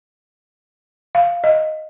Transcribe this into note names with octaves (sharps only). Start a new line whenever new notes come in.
F5
D#5